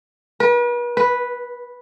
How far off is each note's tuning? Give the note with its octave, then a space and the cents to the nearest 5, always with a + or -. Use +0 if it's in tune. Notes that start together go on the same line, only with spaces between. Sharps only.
B4 -40
B4 -5